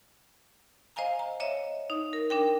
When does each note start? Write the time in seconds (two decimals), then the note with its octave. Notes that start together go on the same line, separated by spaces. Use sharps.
0.96 C5 D#5 F5 G#5 A#5
1.19 A#5
1.40 C#5 D#5 E5
1.90 D#4
2.13 A#4
2.30 D4 A#4 G5